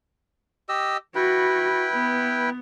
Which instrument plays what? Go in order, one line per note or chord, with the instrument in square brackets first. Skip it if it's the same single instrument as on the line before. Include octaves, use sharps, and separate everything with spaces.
[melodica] G4 D#5 E6
[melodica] E4 B4 G5 [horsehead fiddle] F#4
[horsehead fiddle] B3